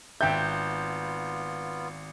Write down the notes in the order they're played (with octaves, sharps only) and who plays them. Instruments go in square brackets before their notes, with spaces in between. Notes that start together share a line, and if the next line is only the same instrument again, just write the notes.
[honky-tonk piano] G#1 G6 [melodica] B3 F4 [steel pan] E5 G5